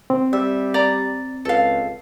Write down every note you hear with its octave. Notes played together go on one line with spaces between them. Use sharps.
C4
G3 E5
D5 A#5 D6
C#2 A4 F5